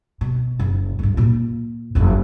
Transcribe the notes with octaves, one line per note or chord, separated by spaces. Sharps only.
B2
F#1
D2 G2
A#2 F4
F#1 F2